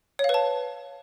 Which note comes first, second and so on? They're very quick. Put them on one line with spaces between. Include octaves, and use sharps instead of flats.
C#5 F5 B4 A5